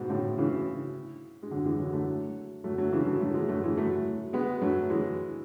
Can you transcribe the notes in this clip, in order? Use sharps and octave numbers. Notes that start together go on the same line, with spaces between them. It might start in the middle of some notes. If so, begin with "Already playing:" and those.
Already playing: G#2 B2
A2 C#3
C#3 E3
G#3
D3 F#3
E3 G#3
D3 F#3
F#3 A3
F#3 A3
F#3 A3
C#3 E3
F#3 A3
F#3 A3
E3 G#3
F#3 A3
E3 G#3
F#3 A3
G#3 B3
F#3 A3
E3 G#3